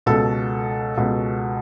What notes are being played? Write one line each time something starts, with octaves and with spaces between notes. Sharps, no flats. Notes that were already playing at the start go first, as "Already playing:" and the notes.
C#2 B2 A4
C#2 B2